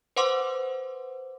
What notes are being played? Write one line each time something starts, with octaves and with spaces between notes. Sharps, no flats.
B4 C5 F#5 C6 D6